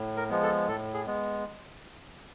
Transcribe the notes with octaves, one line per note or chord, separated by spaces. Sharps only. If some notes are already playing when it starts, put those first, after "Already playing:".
Already playing: A2
A#4
F3 G#3 B3
A4
A2 A4
G#4
G#3 B3